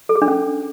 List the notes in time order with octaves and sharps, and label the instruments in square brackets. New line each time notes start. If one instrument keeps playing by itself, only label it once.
[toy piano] A4
G#4
D4
C#4